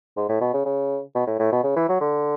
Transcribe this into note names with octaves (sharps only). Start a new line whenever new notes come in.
G#2
A2
B2
C#3
C#3
B2
A2
A2
B2
C#3
E3
F#3
D3